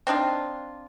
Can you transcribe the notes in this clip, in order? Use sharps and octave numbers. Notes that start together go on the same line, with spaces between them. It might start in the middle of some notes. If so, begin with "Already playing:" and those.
C4 D4 D#4 F4